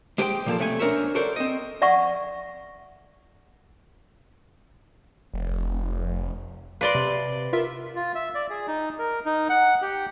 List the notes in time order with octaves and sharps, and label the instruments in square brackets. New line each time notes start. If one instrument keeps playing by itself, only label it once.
[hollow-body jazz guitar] G#3 G4 C5 D5 G5
A#2 F3 A#3 A4
B1 C3 A3 A#4 G#5
C#4 D4 A#4 C5 C#5 E5
F#4 A4 A#4 C5 D5
C4 D#5
[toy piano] D5 E5 F#5 C#6
[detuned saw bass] F1
[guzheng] B4 D5 C6 [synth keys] F5 A#6
[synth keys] C3
F4 A#4 E5
[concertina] F4
E5
D5
G#4
D#4
A#4
D#4
F#5
G4